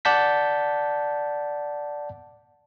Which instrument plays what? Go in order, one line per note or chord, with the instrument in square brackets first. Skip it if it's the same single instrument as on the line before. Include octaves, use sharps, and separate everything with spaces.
[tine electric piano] D5 F#5 A5 G6 B6